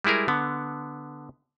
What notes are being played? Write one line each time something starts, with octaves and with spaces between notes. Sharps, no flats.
G3 G#3 E4 G#4 A#4
D3 B3